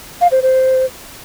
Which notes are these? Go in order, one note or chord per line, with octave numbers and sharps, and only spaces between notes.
F5
C5
C5